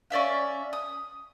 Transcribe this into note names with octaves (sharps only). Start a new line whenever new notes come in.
C#4 D5 E5 F5
D#6